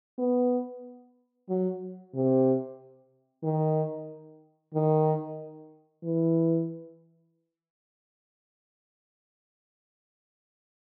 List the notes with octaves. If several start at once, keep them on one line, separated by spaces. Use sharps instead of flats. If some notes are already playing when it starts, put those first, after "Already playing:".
B3
F#3
C3
D#3
D#3
E3